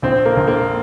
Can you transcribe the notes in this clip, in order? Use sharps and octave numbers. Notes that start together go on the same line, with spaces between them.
A#1 C4
A#3
A#1
A#3